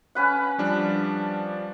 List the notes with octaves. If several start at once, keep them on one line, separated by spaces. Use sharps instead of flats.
C#4 B4 F#5
F3 G3 D4